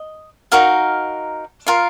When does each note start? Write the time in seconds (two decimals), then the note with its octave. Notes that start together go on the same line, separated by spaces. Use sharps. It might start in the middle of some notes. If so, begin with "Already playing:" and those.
Already playing: D#5
0.52 D#4 F#4 A#4 F5
1.67 F4 A#4 F5